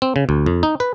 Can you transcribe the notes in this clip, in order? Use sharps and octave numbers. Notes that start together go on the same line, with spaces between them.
C4
C#3
D2
F2
D#4
B4